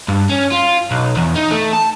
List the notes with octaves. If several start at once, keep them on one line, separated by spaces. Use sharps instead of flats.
G2
C#4
F4
B1
E2
D#4
A3
A5